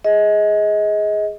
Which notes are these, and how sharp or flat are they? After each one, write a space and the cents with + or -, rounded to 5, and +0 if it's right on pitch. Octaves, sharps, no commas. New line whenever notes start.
G#4 +0 D#5 +25